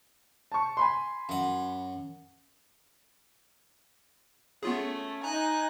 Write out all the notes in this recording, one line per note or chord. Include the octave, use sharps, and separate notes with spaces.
A5 C#6
G#5 B5 C6
F#2 F#5
A3 B3 C#4 F4 G#4
D#4 G#5 A#5 F#6